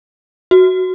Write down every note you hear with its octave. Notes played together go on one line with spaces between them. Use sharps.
F#4